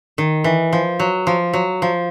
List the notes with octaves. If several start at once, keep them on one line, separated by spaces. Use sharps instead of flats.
D#3
E3
F3
F#3
F3
F#3
F3